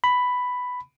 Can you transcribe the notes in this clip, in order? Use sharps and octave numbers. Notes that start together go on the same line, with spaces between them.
B5